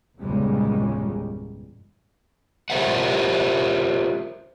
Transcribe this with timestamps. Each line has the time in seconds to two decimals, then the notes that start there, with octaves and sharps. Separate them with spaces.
0.19 G1 E2 A#2 C#3 G3 G#3
2.70 F4 G4 A#4 C5 E5 F#5